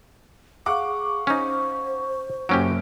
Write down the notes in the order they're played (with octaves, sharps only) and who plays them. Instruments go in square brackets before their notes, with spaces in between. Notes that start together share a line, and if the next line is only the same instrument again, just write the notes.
[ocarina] G#4 [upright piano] F5 F#5 D6 [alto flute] C#6
[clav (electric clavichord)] C#4 D#4 [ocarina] C5
[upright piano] F#1 D7 [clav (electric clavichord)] F#3 C#4 G4